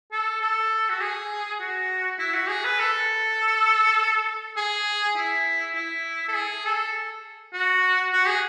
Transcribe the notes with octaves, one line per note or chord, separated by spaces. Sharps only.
A4
A4
F#4
G#4
F#4
E4
F#4
G#4
B4
A4
G#4
E4
E4
A4
G#4
A4
F#4
F#4
G#4